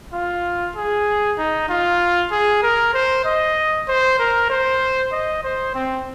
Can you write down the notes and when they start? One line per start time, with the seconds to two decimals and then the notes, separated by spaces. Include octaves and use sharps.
0.14 F4
0.76 G#4
1.38 D#4
1.69 F4
2.31 G#4
2.63 A#4
2.94 C5
3.25 D#5
3.88 C5
4.19 A#4
4.50 C5
5.12 D#5
5.44 C5
5.75 C4